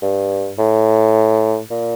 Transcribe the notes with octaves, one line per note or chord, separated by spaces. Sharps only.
G2
A2
A#2